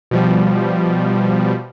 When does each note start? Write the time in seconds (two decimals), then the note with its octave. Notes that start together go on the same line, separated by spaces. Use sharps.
0.11 B2 F3 G3